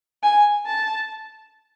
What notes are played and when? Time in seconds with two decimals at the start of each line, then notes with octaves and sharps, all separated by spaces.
0.23 G#5
0.66 A5